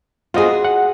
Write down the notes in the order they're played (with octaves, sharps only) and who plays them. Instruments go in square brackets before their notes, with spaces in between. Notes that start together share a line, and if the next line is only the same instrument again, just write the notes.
[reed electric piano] F4 C5 D#5 [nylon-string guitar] F#4 G#4
[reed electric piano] F#5